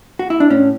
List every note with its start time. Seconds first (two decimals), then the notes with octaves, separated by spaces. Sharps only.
0.19 F#4
0.30 E4
0.40 D4
0.50 A2 C#4